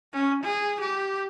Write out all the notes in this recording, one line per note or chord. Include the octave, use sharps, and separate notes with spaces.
C#4
G#4
G4